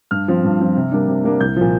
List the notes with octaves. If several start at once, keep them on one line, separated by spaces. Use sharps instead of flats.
G2 F6
F3 C4
G2
F3 C4
C3
G3 A#3 D4
C3
G3 A#3 D4
C2 G6
A#2 F3